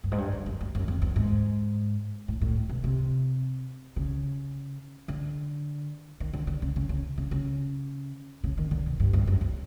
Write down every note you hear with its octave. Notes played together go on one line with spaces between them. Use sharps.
G2
G#2
G2
F#2
F#2
F#2
F#2
F2
E2
G#2
A2
A2
B2
C3
C#3
D3
D#3
D3
D3
C#3
C#3
C#3
C#3
C#3
C#3
D#3
D3
B2
G2
G2
F#2
F2